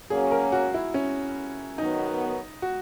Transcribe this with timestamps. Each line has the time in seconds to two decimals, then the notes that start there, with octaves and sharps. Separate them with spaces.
0.10 F#3 A#3 C#4 G#4
0.31 A#4
0.52 F#4
0.74 E4
0.94 C#4
1.78 D#3 F#3 B3 D#4
2.62 F#4